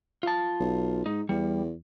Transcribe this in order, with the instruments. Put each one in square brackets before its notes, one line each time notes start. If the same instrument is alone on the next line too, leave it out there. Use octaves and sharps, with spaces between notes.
[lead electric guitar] F4 A5
[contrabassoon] B1
[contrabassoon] G#2 [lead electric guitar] D#4
[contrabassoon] E2 [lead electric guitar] G3